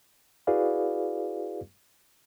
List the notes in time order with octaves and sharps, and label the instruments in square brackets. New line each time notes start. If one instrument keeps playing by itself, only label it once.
[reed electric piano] E4 F#4 G#4 B4 D5 F5